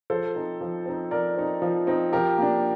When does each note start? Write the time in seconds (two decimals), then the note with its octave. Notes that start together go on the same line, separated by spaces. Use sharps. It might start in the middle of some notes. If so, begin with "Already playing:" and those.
0.10 F3 A4 C5
0.35 C4 D#4
0.61 F3
0.86 C4 D#4
1.11 F3 A#4 D5
1.36 C4 D#4
1.62 F3
1.87 C4 D#4
2.12 F3 G4 A#4
2.38 A#3 D4